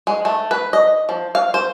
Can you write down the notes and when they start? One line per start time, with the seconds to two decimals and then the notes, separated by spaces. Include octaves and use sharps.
0.07 G#3
0.25 A3
0.51 B4
0.73 D#5
1.09 F3
1.35 F5
1.54 C5